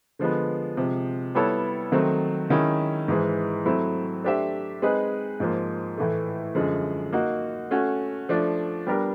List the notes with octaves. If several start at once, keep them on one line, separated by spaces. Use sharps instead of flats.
D3 F3 G#3 B3
C3 F3 G#3
G3 B3 E4 A4 C#5
D#3 F#3 A3 C4
D#3 G#3 C#4 E4
G#2 E3 G#3
F#3 A3 C4 E4
A3 D4 G4 C5 E5
G#3 C4 D#4 G#4 B4
G#2 F3 A#3
A2 E3 A3
F#2 D3 F3 G#3
A#3 D#4 F#4
A3 C#4 F#4
F3 A3 D4
G3 B3 D4 G4 A#4